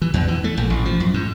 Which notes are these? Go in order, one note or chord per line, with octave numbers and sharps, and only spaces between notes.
E3
E2
E3
A3
A#1
A1
F3
F#2
G#2